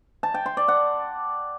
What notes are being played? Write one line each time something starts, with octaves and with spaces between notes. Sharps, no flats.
A5
G5
C6
D5
F#5